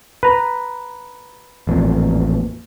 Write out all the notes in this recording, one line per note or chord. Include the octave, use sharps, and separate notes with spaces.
B4 A#5
A1 F2 A#2